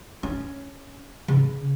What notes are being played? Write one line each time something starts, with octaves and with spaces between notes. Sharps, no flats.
C#4
C#3